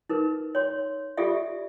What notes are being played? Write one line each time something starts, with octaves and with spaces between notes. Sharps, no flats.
D#4 A#4 B4
C#5 C6
F4 G4 A4 D5 E5